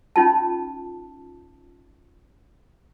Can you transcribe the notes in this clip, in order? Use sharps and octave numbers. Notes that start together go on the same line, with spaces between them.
C#4 D#4 F4 A5